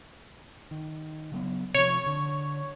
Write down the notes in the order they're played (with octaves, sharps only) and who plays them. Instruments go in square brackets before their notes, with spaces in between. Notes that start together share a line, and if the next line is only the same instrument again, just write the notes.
[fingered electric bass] D#3
C#3 F#3 B3
[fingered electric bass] C3 F3 [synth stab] C#5
[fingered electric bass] D3